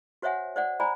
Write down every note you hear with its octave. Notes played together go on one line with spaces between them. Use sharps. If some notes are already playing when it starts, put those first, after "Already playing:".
F#4 C5 C#5 E5 F#5 G#5
C5 D5 F#5
C5 D5 G#5 A#5 B5